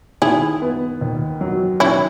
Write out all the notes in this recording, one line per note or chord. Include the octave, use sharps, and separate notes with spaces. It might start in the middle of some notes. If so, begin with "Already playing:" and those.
D#3 E4 G#4
B3
D#2
F#3
D#3 C#4 E4